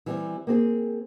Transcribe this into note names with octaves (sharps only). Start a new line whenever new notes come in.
E3 G3 C4
A#3 C4 G#4